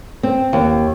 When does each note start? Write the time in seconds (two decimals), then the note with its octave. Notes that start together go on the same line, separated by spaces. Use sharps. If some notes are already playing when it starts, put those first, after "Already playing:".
0.23 C4
0.53 D#2